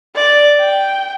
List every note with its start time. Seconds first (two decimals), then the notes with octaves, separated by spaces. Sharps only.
0.15 D5
0.60 G5